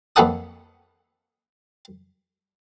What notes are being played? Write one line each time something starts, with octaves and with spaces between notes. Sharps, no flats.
F2 A#3 B4 F#5 A5 D#6